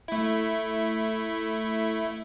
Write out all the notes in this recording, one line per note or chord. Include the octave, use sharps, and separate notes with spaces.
A3 E4